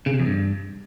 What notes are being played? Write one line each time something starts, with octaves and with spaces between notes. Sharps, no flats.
C#3
C3
F2
G2